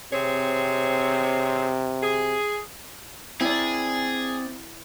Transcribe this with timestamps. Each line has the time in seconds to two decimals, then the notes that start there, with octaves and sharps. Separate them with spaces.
0.13 C3 C4 G#4 C#5
2.03 G#4
3.41 C4 E4 G#4 D5 E5